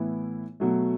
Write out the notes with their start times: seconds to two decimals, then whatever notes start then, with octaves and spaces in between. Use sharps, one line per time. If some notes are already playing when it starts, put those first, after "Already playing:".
Already playing: A2 E3 B3 E4
0.60 B2 F#3 A3